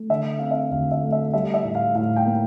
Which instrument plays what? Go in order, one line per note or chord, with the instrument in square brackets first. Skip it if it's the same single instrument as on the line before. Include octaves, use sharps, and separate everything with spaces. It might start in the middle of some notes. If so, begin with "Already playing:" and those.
Already playing: [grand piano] A3
D3 E5
C4 F5
E5
D2 F5
E5
A3
E5
G3 E5
E5
A2
F5
A2 F5
G5
A#3